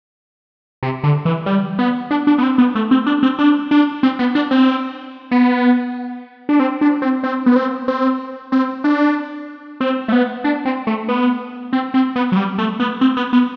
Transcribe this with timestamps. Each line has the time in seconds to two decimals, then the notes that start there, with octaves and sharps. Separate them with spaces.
0.83 C3
1.04 D3
1.25 E3
1.46 G3
1.79 B3
2.11 D4
2.27 D4
2.38 B3
2.43 C4
2.58 B3
2.75 A3
2.91 C4
3.06 D4
3.23 C4
3.39 D4
3.71 D4
4.03 C4
4.19 B3
4.35 D4
4.51 C4
5.31 B3
6.49 D4
6.60 C4
6.81 D4
7.02 C4
7.23 C4
7.46 B3
7.56 C4
7.88 C4
8.52 C4
8.84 D4
9.80 C4
10.08 A3
10.12 B3
10.44 D4
10.65 C4
10.87 A3
11.08 B3
11.73 C4
11.94 C4
12.16 B3
12.32 F#3
12.37 G3
12.58 A3
12.80 B3
13.01 C4
13.17 B3
13.33 B3